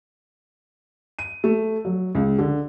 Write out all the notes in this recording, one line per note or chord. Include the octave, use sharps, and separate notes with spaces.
D#7
A3
F#3
C#2
D3